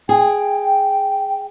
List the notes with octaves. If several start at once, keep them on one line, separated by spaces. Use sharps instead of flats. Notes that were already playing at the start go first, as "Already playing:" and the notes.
G#4 G5